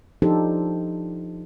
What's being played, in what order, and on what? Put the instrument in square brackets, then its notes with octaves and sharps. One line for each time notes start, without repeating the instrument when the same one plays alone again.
[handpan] F3 D4 D#4 G4 A4 C5